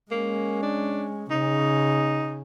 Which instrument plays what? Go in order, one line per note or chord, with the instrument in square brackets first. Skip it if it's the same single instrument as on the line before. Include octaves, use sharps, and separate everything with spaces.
[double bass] G#3 C#4 [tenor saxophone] A#3
[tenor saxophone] D4
[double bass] C#3 [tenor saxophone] D#4